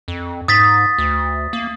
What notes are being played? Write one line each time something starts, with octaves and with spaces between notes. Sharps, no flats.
F2
G#2 D#6 A6 B6
D2
A#3